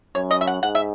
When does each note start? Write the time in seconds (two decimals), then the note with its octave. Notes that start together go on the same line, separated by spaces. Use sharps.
0.15 F#2 C#5
0.31 D#5
0.41 E5
0.47 F#5
0.63 G#2 F#5
0.75 E5